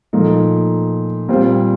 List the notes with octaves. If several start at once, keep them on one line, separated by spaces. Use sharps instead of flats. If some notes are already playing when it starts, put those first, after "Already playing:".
A#2 F3 A3 D#4
A#2 G3 C4 F4 C5